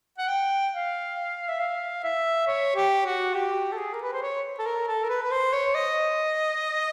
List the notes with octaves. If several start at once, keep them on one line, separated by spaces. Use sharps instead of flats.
F#5
G5
F5
E5
F5
E5
C#5
G4
F#4
G4
A4
G#4
A#4
B4
C5
C#5
A4
A#4
A4
A#4
B4
B4
C5
C#5
D#5